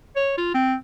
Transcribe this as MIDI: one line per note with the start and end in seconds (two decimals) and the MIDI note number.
0.16 0.36 73
0.38 0.54 65
0.54 0.74 60